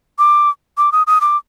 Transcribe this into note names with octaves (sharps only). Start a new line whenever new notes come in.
D6
D6
D#6
D#6
D6